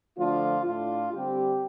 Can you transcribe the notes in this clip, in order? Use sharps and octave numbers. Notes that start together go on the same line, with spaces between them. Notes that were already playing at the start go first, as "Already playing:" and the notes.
D3 F3 A3 D4 F4
A2 A3 D4 F4
D3 G3 C4 G4